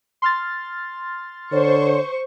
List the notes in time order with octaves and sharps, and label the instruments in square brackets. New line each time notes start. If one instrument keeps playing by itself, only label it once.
[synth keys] C6 F6 A6
[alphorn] D3 [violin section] C5 C#6 [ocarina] C#5